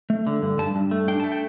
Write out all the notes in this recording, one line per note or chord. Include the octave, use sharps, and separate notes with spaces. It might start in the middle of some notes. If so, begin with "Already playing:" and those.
A3
D3
G2
G2 A5
G2
A3
D4 G5
A3 A5
G5